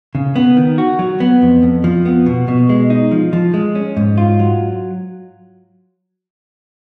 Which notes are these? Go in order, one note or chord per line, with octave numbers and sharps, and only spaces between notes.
C#3
B3
D#3
F#4
F#3
B3
F2
F2
F3
B3
B2
B2
G#3
D#4
F3
F3
G#3
C#4
G#2
F4
F#3